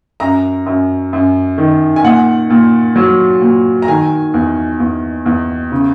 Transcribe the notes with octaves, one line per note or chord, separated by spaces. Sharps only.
F#2 A#5
F#2
F#2
D#3
G#5
A#2 F#5
A#2
F#3
A#2
A#5
D#3 G#5
E2
E2
E2
C#3